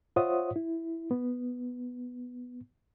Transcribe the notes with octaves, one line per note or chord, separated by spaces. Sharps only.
F4 C5 C#5 E5 F#5 D#6
E4
B3